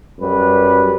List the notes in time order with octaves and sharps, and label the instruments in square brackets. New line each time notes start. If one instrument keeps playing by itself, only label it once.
[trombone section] F#2 G3 B4